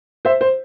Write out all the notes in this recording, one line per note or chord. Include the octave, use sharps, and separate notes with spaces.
C5 E5
C5